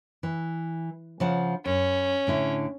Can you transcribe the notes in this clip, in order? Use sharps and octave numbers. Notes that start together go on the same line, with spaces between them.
E3
C#3 F3 F#5
F#2 C#4
A2 D3 E4